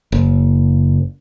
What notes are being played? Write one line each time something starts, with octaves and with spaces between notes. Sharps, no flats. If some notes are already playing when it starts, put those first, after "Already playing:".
F#1